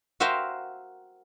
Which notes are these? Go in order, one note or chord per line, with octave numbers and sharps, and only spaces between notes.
F#4 A#4 C5 E5 F5 G5